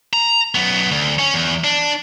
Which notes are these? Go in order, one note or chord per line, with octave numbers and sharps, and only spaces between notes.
A#5
F#2 B3
D2
C#4
E2
D4